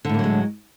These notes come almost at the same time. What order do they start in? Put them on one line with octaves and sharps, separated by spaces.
D3 A2 A#3 F#3 G#3